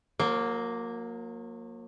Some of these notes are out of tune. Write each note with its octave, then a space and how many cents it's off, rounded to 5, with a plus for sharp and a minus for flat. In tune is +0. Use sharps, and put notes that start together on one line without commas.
F#3 -40 A#3 +0